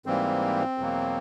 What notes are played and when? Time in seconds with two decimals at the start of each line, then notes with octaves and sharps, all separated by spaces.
0.06 G#2 E3 G3 A#3 C4
0.78 E2 B2 F#3 A#3